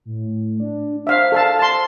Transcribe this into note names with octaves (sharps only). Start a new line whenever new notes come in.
A2
D4
C5 E5 F5
A4 F5 A5
A5 C6